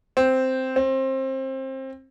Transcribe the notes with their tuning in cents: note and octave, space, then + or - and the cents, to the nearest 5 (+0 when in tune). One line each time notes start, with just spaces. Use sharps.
C4 -5
C4 +25